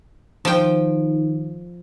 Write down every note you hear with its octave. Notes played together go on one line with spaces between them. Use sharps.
D#3 F3 G5